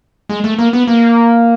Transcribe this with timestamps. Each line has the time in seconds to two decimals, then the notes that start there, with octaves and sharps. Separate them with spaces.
0.29 G#3
0.44 A3
0.59 A#3
0.73 B3
0.87 A#3